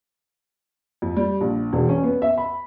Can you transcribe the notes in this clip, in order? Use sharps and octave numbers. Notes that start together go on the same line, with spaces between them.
F2
G3
A#1
E1
C#4
B3
E5
B5